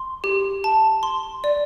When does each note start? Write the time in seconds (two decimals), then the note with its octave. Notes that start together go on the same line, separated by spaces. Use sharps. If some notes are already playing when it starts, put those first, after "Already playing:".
Already playing: C6
0.24 G4
0.64 A5
1.03 C6
1.44 D5